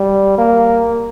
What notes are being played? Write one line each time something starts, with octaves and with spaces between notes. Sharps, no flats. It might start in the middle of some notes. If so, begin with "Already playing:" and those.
Already playing: G3
A#3